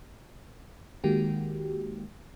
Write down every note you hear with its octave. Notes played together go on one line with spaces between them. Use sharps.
D#3 G#3 A#3 F#4 G4